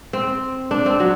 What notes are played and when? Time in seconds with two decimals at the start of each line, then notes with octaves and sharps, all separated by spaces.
0.13 C4
0.71 D4
0.86 C4
1.00 F#3